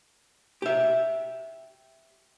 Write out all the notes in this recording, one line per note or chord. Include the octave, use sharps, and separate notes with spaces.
G4 E5